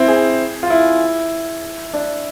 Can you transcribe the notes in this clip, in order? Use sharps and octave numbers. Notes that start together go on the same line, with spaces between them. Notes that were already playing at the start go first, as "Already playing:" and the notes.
Already playing: C4 E4
G#4
F4
E4
D4